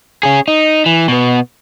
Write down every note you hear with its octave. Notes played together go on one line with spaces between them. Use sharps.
C#4 G#4
D#4
E3
B2 B3